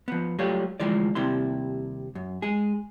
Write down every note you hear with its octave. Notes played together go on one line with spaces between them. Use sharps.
F3 B3
F#3 G3 A3 F4 G4 C#5
D2 C3 E3 F3 G#3 D5
D#2 C3 G3 E4 C6
F#2
G#3 G#4